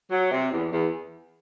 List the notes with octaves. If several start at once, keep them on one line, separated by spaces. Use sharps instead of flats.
F#3
C3
E2
E2